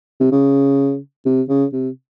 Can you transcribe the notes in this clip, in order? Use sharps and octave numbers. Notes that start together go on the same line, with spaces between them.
C3
C#3
C3
C#3
C3